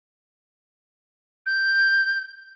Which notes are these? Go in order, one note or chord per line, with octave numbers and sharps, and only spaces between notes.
G6